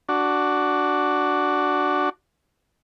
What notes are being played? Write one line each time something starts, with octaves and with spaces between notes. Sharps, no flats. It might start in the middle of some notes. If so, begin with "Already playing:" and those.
D4 F#4